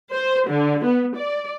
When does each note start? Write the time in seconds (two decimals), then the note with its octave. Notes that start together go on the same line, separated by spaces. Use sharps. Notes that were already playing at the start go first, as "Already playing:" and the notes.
0.13 C5
0.49 D3
0.85 B3
1.16 D5